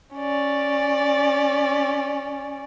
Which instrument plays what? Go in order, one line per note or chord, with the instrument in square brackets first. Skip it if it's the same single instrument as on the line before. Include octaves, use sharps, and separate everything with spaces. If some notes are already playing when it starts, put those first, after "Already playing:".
[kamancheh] C#4 D5